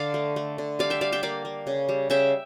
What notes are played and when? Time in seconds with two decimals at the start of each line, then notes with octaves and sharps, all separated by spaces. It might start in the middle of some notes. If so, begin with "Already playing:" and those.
Already playing: D3 D5 F5
0.14 A3
0.36 A3
0.58 D3
0.79 G3 D5 F5
0.90 E5 G5
1.01 G3 D5 F5
1.12 E5 G5
1.23 A#3 D5 F5
1.45 A#3
1.67 C#3
1.89 G3
2.10 C#3 E5 G5